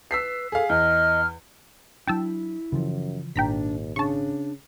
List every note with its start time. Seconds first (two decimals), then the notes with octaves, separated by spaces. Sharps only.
0.11 B4 E6 B6 C7
0.52 G#4 A4 F5
0.69 E2 D#5 F6
2.07 F#3 D4 E4 G5 A5 E6
2.72 F#2 C#3 E3 F3
3.36 G#1 D#2 A#2 D4 G5 A#5 B6
3.96 C#3 D4 A5 C#6